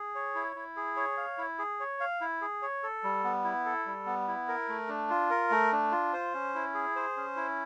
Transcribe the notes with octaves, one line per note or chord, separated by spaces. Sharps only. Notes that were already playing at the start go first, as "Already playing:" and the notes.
Already playing: G#4
C#5
E4
E4
G#4
C#5
F5
E4
G#4
C#5
F5
E4
G#4
C#5
A4
G3
B3
E4
A4
G3
B3
E4
A#4
A3
D4
F4
A#4
A3
D4
F4
C5
C#4
E4
G#4
C5
C#4
E4